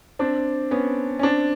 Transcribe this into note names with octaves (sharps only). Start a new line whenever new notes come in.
C4 D4
B3 C#4
C#4
C4 D4